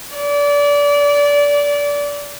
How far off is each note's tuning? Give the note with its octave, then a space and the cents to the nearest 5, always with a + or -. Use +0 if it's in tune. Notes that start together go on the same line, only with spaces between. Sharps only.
D5 -25